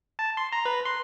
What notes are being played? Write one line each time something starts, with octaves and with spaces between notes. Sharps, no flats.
A5
C6
A#5
B4
C6